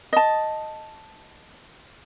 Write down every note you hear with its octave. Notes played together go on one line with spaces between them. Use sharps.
D#5 A5